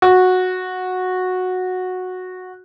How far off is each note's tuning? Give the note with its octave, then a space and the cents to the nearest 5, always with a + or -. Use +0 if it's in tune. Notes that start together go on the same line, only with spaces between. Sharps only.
F#4 -10